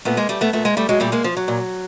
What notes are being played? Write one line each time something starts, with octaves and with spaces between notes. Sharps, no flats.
A#2 A3 B3
G#3 A#3
G3 A3
A3 B3
A#2 A3 B3
G#3 A#3
G3 A3
F#3 G#3
A#2 G3 A3
G#3 A#3
F3
F#3
A#2